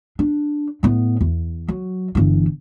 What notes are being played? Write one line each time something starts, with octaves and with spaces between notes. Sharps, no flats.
D4
A2 B3
E2
F#3
G1 E3